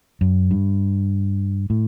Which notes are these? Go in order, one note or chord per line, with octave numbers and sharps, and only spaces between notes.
F#2
G2
A2